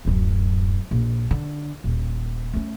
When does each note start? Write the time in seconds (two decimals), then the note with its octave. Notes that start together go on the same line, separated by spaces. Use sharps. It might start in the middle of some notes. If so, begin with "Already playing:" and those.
0.05 D1 F#2
0.91 A#1
1.31 D3
1.84 D#1
2.54 A3 C#4